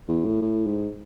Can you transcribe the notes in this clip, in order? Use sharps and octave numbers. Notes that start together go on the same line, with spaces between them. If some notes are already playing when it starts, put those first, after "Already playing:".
E2
A2
A2
G#2